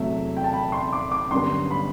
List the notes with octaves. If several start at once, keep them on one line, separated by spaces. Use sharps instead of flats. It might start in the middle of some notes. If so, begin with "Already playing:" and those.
Already playing: E2 C3 F#3 A3 E5
G5
A5
B5
C6
D6
D6
G1 F#2 D3 G3 B3 C6
B5